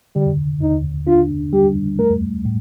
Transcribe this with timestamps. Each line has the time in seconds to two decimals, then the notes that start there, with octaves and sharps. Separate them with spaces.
0.16 D3 G3
0.62 D#2 D#4
1.07 D4 F4
1.53 G3 G4
1.99 A3 A#4
2.45 A2